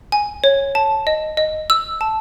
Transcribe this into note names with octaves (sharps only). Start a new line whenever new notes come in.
G#5
C#5
A5
D#5
D#5
E6
A5